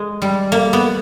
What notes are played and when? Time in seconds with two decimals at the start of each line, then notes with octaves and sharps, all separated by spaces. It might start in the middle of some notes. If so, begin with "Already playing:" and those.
Already playing: G#3
0.22 G3
0.52 A#3
0.73 B3